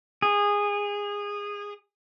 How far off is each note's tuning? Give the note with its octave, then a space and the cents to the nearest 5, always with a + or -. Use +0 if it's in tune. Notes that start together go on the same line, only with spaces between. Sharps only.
G#4 -20